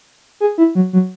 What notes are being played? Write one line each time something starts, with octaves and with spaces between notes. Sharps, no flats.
G#4
E4
F#3
F#3